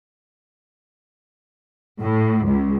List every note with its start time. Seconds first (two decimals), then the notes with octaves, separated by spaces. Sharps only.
2.01 A2
2.47 C#2